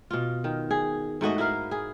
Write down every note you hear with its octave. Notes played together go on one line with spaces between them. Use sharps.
B2 F4
D#3
G#4
G#2 A3 F#4 D#5
E4 F#4 A#4 F5
G#4